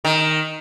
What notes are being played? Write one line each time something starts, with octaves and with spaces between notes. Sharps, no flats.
D#3